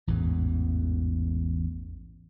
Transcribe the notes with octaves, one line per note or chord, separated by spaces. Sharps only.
A1 E2 G#2 E3